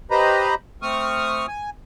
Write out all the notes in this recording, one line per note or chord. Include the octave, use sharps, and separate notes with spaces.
G4 B4 C5 D#5 A#5 B5
A3 C4 C#6 D#6 F6
G#5